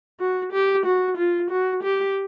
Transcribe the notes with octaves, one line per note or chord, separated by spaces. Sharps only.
F#4
G4
F#4
F4
F#4
G4